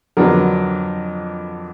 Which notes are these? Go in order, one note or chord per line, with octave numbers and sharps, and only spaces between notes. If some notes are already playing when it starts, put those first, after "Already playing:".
F2 D3 F#3 B3 D4 A#4